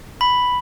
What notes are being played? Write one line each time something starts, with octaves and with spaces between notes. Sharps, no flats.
B5